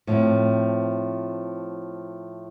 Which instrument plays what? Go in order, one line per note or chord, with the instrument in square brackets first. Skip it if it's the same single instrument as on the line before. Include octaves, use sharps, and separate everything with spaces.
[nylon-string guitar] A2 F3 A3 C4